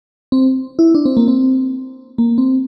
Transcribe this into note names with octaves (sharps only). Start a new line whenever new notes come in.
C4
E4
D4
C4
A#3
C4
A#3
C4